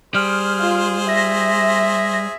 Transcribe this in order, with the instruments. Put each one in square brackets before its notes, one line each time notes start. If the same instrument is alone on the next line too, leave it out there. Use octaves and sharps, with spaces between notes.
[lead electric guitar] G3 [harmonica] G#4 C5 [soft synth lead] F6
[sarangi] F4
[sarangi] E5 [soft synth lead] A#6